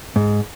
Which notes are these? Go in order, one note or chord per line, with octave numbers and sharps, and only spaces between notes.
G#2